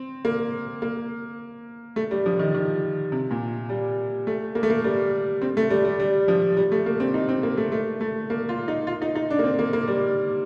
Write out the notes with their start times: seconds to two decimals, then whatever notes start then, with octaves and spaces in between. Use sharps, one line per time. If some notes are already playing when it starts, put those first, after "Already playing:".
Already playing: C4
0.25 A#3
0.82 A#3
1.96 A3
2.11 G3
2.26 F3
2.39 D#3
2.54 D#3
3.12 C3
3.31 A#2
3.69 G3
4.27 A3
4.55 A#3
4.63 A3
4.70 A#3
4.84 G3
5.42 C4
5.57 A3
5.70 G3
5.85 G3
6.00 G3
6.28 F3
6.57 G3
6.72 A3
6.86 A#3
7.00 C4
7.14 D#4
7.29 C4
7.43 A#3
7.57 A3
7.72 A3
8.01 A3
8.30 A#3
8.49 F4
8.68 D#4
8.87 F4
9.02 D#4
9.15 D#4
9.30 D4
9.39 A#3
9.44 C4
9.59 A#3
9.73 A#3
9.88 G3